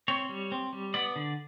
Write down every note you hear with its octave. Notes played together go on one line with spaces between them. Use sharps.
C4 C#5
G3
C4
G3
B3 D5
D3